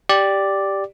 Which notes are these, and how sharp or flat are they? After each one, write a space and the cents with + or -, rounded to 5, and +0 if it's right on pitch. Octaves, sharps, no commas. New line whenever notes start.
G4 +0 D5 +0